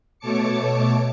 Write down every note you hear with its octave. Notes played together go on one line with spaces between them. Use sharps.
B2 A3 C#5 A5 D6 C#7